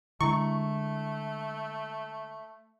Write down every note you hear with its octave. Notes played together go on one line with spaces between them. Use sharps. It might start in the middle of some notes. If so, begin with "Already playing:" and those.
D3 G#3 A3 E4 C#6